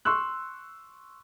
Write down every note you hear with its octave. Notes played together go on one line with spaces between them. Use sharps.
C6 C#6 E6 F#6